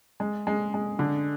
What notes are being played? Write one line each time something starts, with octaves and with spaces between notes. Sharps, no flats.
G#3
G#3
G#3
D3